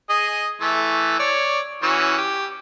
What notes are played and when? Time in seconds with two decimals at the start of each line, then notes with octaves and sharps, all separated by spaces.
0.09 G#4 D#5
0.61 E3 A3
1.19 C#5 D5
1.83 E3 C#4 F#4
2.18 G4